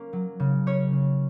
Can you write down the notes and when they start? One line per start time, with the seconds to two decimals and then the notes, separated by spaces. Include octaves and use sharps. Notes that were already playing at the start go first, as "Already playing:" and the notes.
Already playing: A#3 C#4
0.13 F#3
0.40 C#3
0.67 C#4 C#5
0.93 C#3